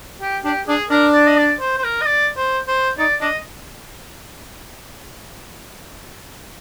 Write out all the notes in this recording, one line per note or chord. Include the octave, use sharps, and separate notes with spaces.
G4
D4 G4
D4 G#4
D4 A#4
D5
D#5
D5
C5
C5
A#4
D#5
D5
C5
C5
D#4 D5
D4 D#5